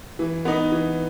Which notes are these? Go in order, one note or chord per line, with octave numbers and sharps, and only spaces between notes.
E3
B3 D#4
E3